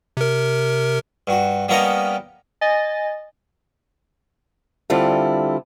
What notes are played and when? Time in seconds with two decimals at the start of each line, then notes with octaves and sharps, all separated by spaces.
0.17 C3 A#4
1.27 G2 F#4
1.69 G3 A#3 B3 C#4 A#4 D#5
2.61 D#5 G#5 A6
4.90 D3 G3 C4 E4 F4 A4